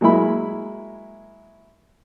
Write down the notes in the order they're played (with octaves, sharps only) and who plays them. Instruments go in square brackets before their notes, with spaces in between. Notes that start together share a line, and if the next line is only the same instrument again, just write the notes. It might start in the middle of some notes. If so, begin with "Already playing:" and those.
[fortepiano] F#3 G#3 A#3 E4 B5